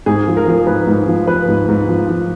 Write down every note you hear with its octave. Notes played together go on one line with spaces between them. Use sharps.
G#2 G#4
F3
A#4
F3
G#2 B4
G#2
F3
F3 B4
G#2
G#2
F3
F3